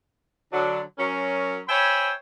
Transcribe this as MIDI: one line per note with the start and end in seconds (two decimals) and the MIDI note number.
0.53 0.81 50
0.53 0.81 54
0.53 0.81 62
0.99 1.59 54
0.99 1.59 61
0.99 1.59 70
1.68 2.12 72
1.68 2.12 73
1.68 2.12 76
1.68 2.12 79
1.68 2.12 80
1.68 2.12 83